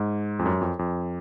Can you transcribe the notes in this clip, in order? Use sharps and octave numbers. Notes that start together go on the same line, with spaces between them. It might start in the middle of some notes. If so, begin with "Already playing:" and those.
Already playing: G#2
F2
F#2
F2
F2